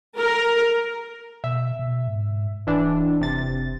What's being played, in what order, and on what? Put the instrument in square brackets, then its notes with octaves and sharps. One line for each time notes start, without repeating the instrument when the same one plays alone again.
[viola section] A#4
[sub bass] B2 [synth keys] E5
[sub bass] B2
G#2
[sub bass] D1 [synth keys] E3 D4
[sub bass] F1 [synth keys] C3 A6